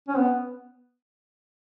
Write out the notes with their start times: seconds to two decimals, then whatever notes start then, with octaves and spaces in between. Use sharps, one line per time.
0.08 C#4
0.17 B3